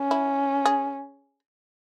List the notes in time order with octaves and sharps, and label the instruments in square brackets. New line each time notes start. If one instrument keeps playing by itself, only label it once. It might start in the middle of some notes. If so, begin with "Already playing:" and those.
Already playing: [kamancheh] C#4
[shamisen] E4
G#4